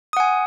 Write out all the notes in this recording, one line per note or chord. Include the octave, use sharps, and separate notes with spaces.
F#5 G#5 D#6